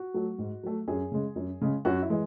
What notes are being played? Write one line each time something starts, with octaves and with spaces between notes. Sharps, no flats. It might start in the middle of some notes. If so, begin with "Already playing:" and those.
Already playing: F#4
F#3 A3
G#2
F#3 A3
F#2 G#4
C#3 G#3
F#2
C#3 G#3
F#2 F#4
E4
E3 G#3